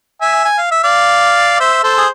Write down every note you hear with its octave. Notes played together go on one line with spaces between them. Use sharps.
E5 G#5
G#5
F5
E5
D5 F5
C5 E5
A4 C5
G#4